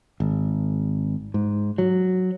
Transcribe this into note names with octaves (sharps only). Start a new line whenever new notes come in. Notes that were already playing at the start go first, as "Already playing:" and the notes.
G#1
G#2
F#3